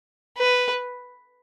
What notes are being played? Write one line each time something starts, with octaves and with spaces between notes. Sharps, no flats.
B4